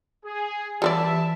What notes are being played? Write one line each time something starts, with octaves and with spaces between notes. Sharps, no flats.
G#4
E3 G3 B4 D5 E5 A5